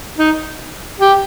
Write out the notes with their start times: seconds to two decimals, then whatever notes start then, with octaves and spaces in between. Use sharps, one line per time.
0.18 D#4
1.01 G4